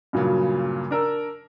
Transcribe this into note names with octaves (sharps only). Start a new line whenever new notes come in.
G2 A#2 C#3 F#3
D4 A#4 E6